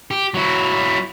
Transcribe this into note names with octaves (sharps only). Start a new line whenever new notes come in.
G4
F#3 E4